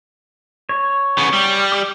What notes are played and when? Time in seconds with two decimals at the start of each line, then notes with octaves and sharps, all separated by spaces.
0.69 C#5
1.18 C#3 B3
1.33 G3
1.72 D6